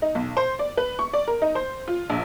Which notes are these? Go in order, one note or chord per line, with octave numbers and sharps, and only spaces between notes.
D#4
B1
C5
D5
B4
C#6
D5
A#4
D#4
C5
F4
A#1